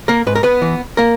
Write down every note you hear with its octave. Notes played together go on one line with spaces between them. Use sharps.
A#3 A#4
G#2 B4
A#4
B3 B4
E3
A#3 A#4